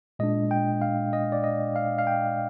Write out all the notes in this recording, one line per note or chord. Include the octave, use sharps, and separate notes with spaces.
A#2 G#3 D4 D#5
G5
F5
D#5
D5
D#5
F5
F5
G5